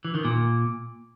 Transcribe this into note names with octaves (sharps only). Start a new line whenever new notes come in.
E3
D#3
A#2